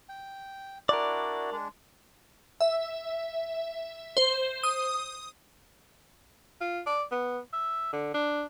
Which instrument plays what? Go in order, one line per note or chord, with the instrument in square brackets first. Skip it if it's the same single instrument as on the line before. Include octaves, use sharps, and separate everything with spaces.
[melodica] G5
[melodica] D4 E4 F#4 [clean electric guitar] A#4 D5
[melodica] G#3 D4
[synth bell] E5
C5
D#6
[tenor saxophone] F4
D5
B3
E5
D3
D4